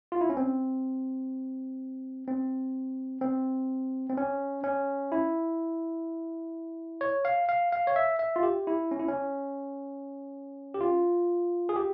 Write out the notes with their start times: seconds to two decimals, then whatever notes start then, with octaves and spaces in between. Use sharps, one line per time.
0.12 F4
0.21 E4
0.30 C#4
0.37 C4
2.28 C4
3.21 C4
4.10 C4
4.17 C#4
4.64 C#4
5.12 E4
7.01 C#5
7.25 F5
7.49 F5
7.72 F5
7.87 C#5
7.96 E5
8.19 E5
8.36 F4
8.43 G4
8.67 E4
8.91 C#4
8.99 E4
9.08 C#4
10.74 G4
10.80 F4
11.69 G#4
11.76 G4